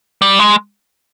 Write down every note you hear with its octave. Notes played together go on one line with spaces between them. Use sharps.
G3
G#3